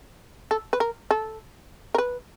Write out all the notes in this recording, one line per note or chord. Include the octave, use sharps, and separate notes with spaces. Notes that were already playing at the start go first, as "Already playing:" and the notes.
A4
B4
A#4
A4
A#4
B4